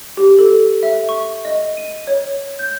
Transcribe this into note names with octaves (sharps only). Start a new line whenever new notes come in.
G4
A4
E5
C#6
D#5
D#7
C#5
G6